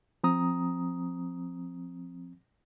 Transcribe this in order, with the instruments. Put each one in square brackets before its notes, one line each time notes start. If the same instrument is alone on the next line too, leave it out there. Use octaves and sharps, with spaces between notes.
[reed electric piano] F3 C4 A#5 D#6